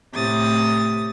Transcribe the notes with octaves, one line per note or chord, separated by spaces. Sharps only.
A2 C3 D#6 A6